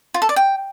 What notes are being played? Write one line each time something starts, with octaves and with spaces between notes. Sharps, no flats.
F4
A4
D5
G5